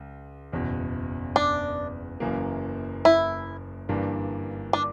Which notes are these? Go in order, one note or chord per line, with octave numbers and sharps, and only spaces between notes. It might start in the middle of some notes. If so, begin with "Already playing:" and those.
Already playing: C#2
F#1 E2 B2
D4
F#1 F#2 E3 A#3
E4
G1 G2 E3 A#3 D4
D4